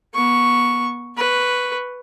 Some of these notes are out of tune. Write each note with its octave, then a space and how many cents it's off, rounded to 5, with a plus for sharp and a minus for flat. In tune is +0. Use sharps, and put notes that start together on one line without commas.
B3 -30 C#6 +0
B4 +0 C#6 +0